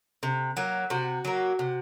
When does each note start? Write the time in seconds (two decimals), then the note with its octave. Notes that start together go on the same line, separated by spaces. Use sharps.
0.23 C3
0.57 F#3 A#3
0.90 C3 F#4
1.25 F#3 A#3
1.59 C3